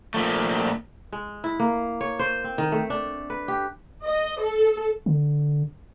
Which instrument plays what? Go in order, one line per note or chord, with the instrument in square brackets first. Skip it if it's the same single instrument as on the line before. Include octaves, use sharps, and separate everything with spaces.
[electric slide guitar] A#2 F3 A3
[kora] G#3
E4
A#3
C#5
C5
C4
D#3
A3
D4
B4
G4
[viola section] D#5
A4
[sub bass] D3